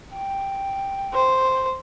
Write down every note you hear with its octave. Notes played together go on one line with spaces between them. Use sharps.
G5
C5